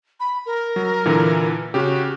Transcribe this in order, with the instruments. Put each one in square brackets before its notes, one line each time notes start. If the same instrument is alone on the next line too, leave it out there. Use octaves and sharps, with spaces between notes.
[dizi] B5
A#4
[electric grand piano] F#3
A#2 D3 E3
[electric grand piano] C#3 G4 [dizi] F#4